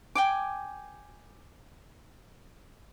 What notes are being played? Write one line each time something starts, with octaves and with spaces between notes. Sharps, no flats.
G5 G#5 D6